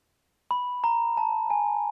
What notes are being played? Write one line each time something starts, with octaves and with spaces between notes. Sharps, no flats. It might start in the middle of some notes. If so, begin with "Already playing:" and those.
B5
A#5
A5
G#5